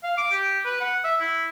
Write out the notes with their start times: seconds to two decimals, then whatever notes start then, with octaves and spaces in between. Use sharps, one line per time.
0.03 F5
0.17 D6
0.32 G4
0.65 B4
0.81 F#5
1.04 E5
1.20 E4